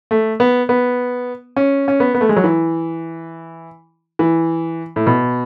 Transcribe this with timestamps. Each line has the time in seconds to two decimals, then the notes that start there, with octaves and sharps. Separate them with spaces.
0.11 A3
0.40 B3
0.69 B3
1.57 C#4
1.88 C#4
2.00 B3
2.15 B3
2.21 A3
2.29 G#3
2.36 F#3
2.44 E3
4.19 E3
4.96 A2
5.07 B2